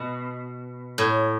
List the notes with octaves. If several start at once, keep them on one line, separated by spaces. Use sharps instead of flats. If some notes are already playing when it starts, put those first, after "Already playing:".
Already playing: B2
A2